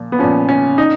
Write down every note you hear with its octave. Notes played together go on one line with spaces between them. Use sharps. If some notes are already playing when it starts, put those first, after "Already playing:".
Already playing: A#2 F3
B3
A#2 F3 C#4
C#4
D#4